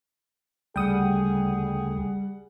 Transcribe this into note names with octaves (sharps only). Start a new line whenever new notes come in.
D2 C#3 G3 A3 G#4 F#5 G5 D#6